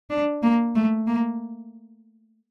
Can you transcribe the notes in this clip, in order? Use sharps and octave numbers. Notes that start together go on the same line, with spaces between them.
D4
A#3
A3
A#3